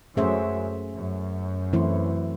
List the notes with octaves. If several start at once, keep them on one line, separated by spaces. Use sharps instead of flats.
F#2 A3 C#4 G#4 C5 E5
F#2
E3 A3 C4 E4 C5